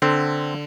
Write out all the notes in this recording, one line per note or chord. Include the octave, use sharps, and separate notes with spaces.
D3 C4